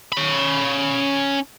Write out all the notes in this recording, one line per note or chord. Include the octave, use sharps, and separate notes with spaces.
C#4 B5